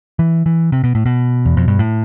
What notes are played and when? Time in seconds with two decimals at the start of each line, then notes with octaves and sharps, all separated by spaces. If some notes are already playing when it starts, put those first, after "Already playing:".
0.19 E3
0.46 E3
0.72 C3
0.84 B2
0.95 A2
1.06 B2
1.45 E2
1.57 F2
1.68 G2
1.79 A2